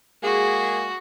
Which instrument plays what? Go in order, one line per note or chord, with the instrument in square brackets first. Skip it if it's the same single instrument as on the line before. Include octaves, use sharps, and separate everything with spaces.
[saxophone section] G#3 A#3 G#4 [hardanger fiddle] F#4